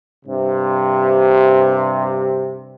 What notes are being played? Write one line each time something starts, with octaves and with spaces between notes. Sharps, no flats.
G2 C3